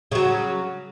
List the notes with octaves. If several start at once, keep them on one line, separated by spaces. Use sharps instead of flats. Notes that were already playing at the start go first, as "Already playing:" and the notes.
C#3 F#3